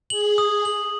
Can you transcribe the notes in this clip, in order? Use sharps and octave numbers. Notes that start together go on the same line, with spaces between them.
G#4 F#7
D#6
F#7